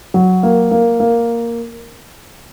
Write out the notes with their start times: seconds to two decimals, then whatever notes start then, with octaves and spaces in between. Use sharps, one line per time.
0.14 F#3
0.43 A#3
0.71 A#3
1.00 A#3